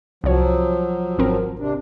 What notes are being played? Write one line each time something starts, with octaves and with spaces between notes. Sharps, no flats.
C2 F3 F#3 C#5
G#1 C4 A#4
C3 D4